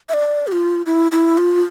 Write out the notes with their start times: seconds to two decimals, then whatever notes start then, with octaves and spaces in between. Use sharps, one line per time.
0.09 E5
0.14 D5
0.47 G4
0.52 F4
0.86 E4
1.12 E4
1.38 F4